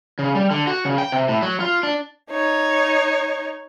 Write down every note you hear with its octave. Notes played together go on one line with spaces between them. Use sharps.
C#3
G3
D3
F#4
C#3
G5
C3
A2
F#3
F4
D4
D#4 C#5